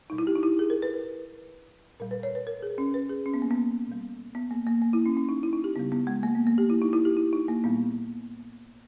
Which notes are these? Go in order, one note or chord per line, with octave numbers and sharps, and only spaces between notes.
B2 G3 D#4
E4
G4
D#4
E4
G#4
A#4
B4
B4
A#2 G3 A#4
B4
C#5
B4
A#4
G#4
C#4
B4
G#4
C#4
B3
A#3
B3
B2 G3
B3
A#3
A#3
A#3
E4
C#4
C#4
D#4
E4
D#4
G4
C#3 G3 B3
B3
G#3
A#3
B3
A#3
G4
E4
D#4
E4
G4
E4
D#4
A#3
A#2 G3 B3